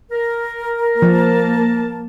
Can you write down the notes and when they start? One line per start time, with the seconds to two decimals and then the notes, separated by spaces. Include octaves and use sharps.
0.12 A#4
1.02 F3 A#3 A5